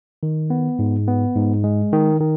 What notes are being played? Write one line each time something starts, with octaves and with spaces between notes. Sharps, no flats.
D#3
B3
G#2
B3
G#2
G#3
D#3
D#3